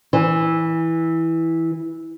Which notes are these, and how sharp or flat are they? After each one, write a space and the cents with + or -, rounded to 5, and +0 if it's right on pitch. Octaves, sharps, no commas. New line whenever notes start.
E3 -10